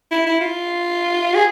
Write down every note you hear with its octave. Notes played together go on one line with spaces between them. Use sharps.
E4
E4
F4
G#4